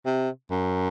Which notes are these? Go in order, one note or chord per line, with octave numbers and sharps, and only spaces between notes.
C3
F#2